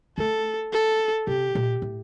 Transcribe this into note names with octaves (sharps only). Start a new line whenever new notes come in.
A3 A4
A4
C3 G4
A#2
A2